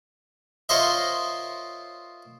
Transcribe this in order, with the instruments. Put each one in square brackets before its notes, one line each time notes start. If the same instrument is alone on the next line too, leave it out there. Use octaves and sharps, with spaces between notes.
[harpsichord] F4 A#4 C5 C#5 D#5 E5